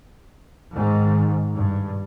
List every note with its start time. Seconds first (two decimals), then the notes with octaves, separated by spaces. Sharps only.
0.73 G#2 D#3
1.53 G2